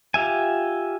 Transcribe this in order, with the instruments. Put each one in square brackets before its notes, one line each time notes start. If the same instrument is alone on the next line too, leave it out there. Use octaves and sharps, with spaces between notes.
[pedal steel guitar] F4 G4 E5 G#5